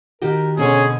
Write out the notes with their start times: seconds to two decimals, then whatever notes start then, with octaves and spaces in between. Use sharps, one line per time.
0.22 D#3 F#4 G4 A#4
0.57 B2 D3 C4 C#4 G#4